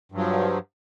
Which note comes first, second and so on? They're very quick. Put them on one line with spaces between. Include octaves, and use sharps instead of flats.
G2 F#3 F3